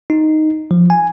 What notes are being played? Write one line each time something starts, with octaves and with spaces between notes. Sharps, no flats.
D#4
F3
G#5